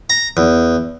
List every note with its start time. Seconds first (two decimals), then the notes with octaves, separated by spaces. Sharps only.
0.10 A#5
0.37 E2